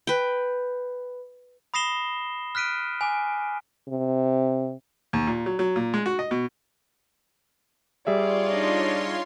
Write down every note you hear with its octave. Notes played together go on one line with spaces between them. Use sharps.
B4 G5
B5 D#6 A#6 C7 E7 G7
F6 F#6 B6 D7 D#7
G#5 D6
C3
D#2
A#2
F#3
F#3
A#2
G#3
F#4
D#5
B2
G3 F4 G#4 C#5 D5 E5 C6
D4 D#4